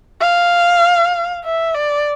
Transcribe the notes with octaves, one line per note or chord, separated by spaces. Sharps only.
F5
E5
D5